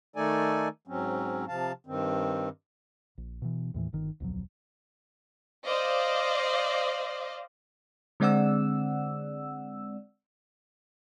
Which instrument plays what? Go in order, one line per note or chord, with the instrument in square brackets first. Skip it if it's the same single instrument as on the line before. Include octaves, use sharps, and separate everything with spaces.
[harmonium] D#3 A3 D#4 A4 D5 G#5
G#2 F#3 C4 C#4
C3 F3 F5 A5
G2 D#3 C4
[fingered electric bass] A#1
B2 E3
D#2 A2 E3
G1 D#3
D1 B1 F2 F#3
[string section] C5 D5 D#5 F5
[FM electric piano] D3 G#3 C4 D5 F#5 E6